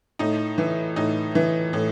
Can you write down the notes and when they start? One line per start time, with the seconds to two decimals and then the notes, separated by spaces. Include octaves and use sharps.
0.19 A2 D#4
0.58 E3
0.96 A2 D#4
1.35 E3
1.73 A2